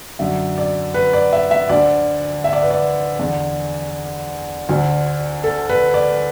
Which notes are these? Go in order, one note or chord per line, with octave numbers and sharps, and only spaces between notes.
F#2 D3 E5
D5
B4
D5
E5
E5
D2 D3 D5
E5
D5
B4
D5
E2 D3
D2 D3
A4
B4
D5